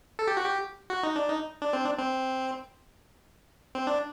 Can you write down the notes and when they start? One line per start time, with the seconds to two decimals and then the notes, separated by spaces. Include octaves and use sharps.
0.19 A4
0.28 G4
0.37 F#4
0.45 G4
0.90 F#4
1.03 D#4
1.16 D4
1.29 D#4
1.62 D4
1.73 C4
1.85 D4
1.98 C4
3.75 C4
3.87 D4